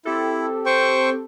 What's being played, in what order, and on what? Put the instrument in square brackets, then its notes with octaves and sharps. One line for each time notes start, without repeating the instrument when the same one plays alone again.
[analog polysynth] C4 G4 A4 [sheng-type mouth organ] E4
[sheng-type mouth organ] C5 G5 C#6